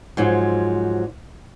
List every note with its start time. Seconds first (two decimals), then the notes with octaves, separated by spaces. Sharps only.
0.17 G#2 F3 F#3